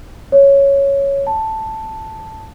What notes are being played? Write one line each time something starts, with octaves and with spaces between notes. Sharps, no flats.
C#5
A5